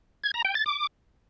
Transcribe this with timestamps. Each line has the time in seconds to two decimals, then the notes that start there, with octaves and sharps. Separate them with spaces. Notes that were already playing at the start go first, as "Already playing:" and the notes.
0.24 G#6
0.34 A#5
0.45 G5
0.55 A6
0.66 D6